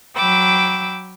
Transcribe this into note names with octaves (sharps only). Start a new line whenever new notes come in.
F#3 G5 B5 D6 E6